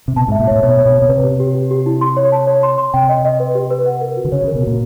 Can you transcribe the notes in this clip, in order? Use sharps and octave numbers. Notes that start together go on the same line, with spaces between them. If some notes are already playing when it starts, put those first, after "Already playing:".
C3
B2 A5
G#2 E5
A#2
A2 C#5
B2 C#5
C#5
B2
C#5
B2
C3 B4
G4
G4
G4
G4
E4
C6
C#5
A5
C#5
C6
C6
C3 G5
D#5
D#5
B4
G4
B4
F#5
A#4
F#4
D3
C#3 C#5
C#3 A#4
B2
A#2 F#4